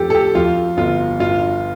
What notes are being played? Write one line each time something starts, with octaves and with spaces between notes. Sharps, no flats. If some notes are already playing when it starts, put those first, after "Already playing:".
Already playing: F2 F3 G4 A4
A4
G4
F2 F4
G1 F4
G2 F4